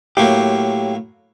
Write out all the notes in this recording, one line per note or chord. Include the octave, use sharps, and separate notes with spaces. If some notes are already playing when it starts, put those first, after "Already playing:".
A2 F#3 A#3 G4